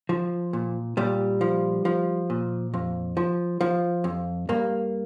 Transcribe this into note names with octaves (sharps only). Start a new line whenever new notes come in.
F3
A#2
A#2 G3
F3
F3
A#2
F2
F3
F3
F2
G2 A#3